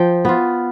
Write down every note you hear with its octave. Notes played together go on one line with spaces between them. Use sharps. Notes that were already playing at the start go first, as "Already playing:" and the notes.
Already playing: F3 G5
B3 F4